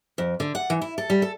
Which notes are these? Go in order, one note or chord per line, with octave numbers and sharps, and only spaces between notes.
F2
D3
F#5
E3
E4
A4
G3
A4